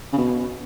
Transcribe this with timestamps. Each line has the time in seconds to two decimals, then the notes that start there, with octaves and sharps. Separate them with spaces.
0.13 C#3
0.18 B2